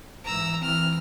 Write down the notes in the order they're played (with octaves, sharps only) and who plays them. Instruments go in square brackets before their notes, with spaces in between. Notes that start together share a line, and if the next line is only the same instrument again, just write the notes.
[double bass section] G#2 E3 [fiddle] A#5 E6
[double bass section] E3 C4 [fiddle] F6